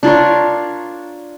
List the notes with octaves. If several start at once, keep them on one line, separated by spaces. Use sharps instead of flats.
D4 F4 A#4 C#5